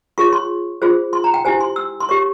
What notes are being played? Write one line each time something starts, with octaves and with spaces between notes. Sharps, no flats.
F4 G#4 C#5 C#6
C6
F4 G#4 C5
C6
A#5
G5
E4 G4 C5 G#5
C6
E6
C6
G4 C#5 C#6